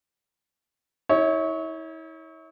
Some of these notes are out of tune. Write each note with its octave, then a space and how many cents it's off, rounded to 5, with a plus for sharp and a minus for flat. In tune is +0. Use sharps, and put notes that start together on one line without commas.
E4 -40 C#5 +5